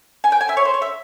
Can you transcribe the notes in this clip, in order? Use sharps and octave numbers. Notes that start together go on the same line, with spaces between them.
G#5
G5
G#5
E5
C#5
C5
C#5
E5